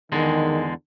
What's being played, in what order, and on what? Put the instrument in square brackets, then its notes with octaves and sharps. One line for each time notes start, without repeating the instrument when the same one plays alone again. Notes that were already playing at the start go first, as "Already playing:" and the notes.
[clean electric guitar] E2 D3 G#3 [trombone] D#3